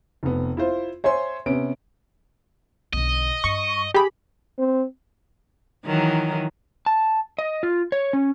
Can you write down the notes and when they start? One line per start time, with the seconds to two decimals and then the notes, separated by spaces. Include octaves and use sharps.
0.23 F1 B3
0.57 E4 F4 C5
1.04 C5 C#5 E5 G#5 C6
1.46 C3 B3 C#4 D7
2.93 B1 D3 D#5
3.44 G2 C#6
3.94 G4 G#4 B5
4.59 C4
5.86 D#3 E3 F#3
6.86 A5
7.39 D#5
7.63 F4
7.92 C#5
8.13 C#4